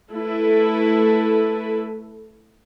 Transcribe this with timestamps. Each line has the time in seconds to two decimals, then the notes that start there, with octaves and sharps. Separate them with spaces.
0.11 A3 E4 A4 B4